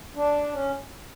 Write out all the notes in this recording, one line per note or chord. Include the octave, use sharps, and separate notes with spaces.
D4
C#4